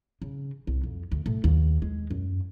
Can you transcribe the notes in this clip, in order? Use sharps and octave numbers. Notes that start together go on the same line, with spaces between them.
C#3
C2
F2
D2
A2
D#2
G#3
F#2